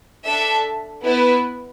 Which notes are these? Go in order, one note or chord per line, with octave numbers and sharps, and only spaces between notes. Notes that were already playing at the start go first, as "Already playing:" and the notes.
D4 A4 E5 A5
B3 E4 B4